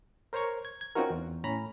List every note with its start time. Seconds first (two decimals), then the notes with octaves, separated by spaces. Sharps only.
0.33 A#4 C5 C#5 A#5 C#6
0.65 G#6
0.81 G#6
0.95 C4 C#4 D#4 F4 F#4 A#4
1.10 E2
1.44 A2 C#4 A#5 B5